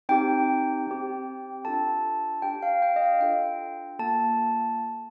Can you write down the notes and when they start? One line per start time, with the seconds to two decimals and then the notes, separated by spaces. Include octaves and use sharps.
0.09 C4 D#4 G4 G5
0.87 C4 G4
1.65 D4 F4 A4 A5
2.42 D4 G4 G5
2.63 F5
2.82 G5
2.96 D#5
3.02 F5
3.20 D4 F4 A4 G5
3.99 A#3 F4 A4 A5